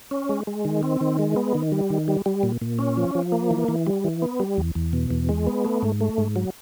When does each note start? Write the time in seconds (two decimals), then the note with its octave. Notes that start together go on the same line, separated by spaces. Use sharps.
0.11 C#4
0.29 G#3
0.47 G#3
0.65 D#3
0.83 C4
1.01 D#3
1.19 G#3
1.36 B3
1.55 D#3
1.72 G3
1.90 D#3
2.08 G3
2.26 G3
2.43 A#2
2.61 A#2
2.79 C#4
2.97 F3
3.15 F3
3.32 A#3
3.51 E3
3.68 E3
3.87 G3
4.04 E3
4.22 B3
4.40 G3
4.57 E2
4.75 E2
4.93 B2
5.10 E2
5.29 G#3
5.47 B3
5.65 A3
5.82 G#2
6.01 A3
6.18 G#2
6.36 F#3